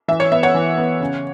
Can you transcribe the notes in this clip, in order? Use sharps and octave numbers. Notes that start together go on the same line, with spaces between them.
E3 E5
C#5
B3 E5
C#5 F#5
E3
B3
C#3